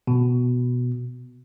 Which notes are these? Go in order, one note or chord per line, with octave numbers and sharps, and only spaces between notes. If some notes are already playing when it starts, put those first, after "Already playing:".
B2